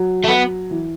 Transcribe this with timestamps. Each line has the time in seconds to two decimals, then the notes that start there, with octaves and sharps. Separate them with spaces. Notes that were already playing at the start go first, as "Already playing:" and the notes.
Already playing: F#3
0.24 A3
0.28 B3
0.71 E3